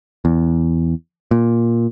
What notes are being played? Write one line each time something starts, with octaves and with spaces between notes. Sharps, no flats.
E2
A#2